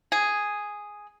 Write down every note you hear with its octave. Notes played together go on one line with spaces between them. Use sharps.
G#4